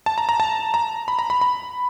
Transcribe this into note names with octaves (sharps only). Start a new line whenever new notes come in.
A5
A#5
A#5
A5
A#5
B5
A#5
B5
B5